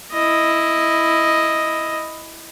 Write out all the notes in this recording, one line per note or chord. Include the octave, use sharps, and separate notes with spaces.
E4 D#5